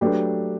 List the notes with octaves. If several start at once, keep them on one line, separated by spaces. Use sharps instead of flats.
F#3 A3 D4 G4 B4